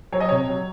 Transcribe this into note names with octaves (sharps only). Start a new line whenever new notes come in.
F#3 C#5
D#5
C3 C#5
F#3